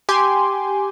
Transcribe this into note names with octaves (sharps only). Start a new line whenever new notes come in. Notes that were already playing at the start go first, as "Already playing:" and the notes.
G4 G5 G#5 C6 D6